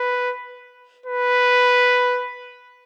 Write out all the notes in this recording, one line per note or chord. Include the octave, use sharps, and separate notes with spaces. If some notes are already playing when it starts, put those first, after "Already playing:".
Already playing: B4
B4